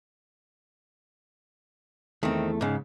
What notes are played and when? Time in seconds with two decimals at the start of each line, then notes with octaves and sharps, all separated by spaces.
2.23 E2 D#3 A3 C4
2.61 G#2 C#3